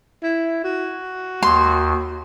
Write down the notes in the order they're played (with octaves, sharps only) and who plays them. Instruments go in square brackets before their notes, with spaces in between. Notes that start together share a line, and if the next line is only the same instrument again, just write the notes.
[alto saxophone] E4
F#4
[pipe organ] D#2 [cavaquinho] C6